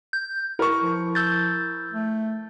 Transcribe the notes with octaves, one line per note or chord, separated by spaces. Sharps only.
G6
E4 A#4 C#6
F3
E6 G6 A6
A3